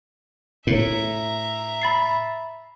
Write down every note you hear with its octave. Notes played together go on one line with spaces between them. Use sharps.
A2 E5 A#5
B5 A6 C7